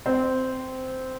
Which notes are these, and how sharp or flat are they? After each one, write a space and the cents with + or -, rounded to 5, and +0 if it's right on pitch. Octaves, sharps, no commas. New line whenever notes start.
C4 -10